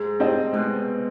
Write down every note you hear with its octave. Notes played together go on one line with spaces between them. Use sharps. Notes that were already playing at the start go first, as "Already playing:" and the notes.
Already playing: G#2 G#3
C4 G4 C5 D#5
B2 G#3